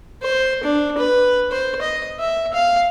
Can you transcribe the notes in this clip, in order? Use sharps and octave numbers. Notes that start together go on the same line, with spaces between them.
C5
D4
B4
C5
D#5
E5
F5